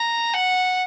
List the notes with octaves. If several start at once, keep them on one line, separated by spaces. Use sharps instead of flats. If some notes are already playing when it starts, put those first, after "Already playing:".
Already playing: A#5
F#5